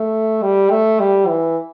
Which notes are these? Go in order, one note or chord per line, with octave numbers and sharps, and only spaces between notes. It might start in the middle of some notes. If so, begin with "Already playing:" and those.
Already playing: A3
G3
A3
G3
E3